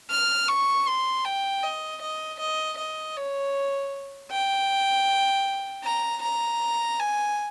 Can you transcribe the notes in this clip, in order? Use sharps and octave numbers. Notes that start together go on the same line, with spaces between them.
F6
C#6
C6
G5
D#5
D#5
D#5
D#5
C#5
G5
A#5
A#5
G#5